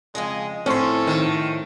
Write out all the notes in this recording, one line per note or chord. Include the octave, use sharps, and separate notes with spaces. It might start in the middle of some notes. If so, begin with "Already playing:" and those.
F2 C#3 G#3 D#5
A2 F3 C4 C#4 A4 C5 C6
D#3